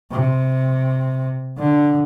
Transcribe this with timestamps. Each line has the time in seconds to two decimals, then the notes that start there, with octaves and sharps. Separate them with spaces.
0.12 C3
1.58 D3